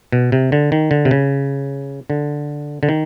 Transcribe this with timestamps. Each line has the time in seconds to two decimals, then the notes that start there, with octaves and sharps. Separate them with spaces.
0.12 B2
0.32 C3
0.52 D3
0.72 D#3
0.91 D3
1.05 C3
1.11 C#3
2.10 D3
2.83 D3
2.89 D#3